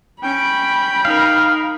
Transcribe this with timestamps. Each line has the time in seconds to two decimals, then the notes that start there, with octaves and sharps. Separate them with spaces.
0.23 C#4 G5 B5 D7
1.05 D#4 A#4 F5